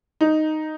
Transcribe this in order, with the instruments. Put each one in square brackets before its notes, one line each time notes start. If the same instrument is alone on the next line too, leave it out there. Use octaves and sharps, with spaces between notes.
[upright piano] D#4